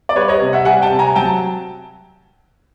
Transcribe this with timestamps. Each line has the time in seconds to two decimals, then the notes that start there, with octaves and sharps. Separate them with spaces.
0.09 D5
0.16 G3 B4 C#5
0.28 C#5 D#5
0.41 C3
0.53 E5 F#5
0.65 G3 F#5 G#5
0.82 G5 A5
0.91 C3
0.99 G#5 A#5
1.16 F#3 G5 A5